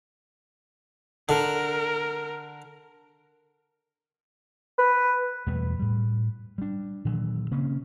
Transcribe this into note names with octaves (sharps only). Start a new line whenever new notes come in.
D3 A#4
B4
E2 B2 G3 A3
A2 G3
G3 D4
A#2 D#3 E3 F#3
C#3 A#3 C4 C#4